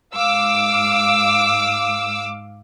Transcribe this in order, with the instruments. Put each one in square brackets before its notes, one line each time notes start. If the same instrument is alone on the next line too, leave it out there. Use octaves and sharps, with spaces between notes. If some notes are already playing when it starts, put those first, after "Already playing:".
[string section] G#2 F5 D6 E6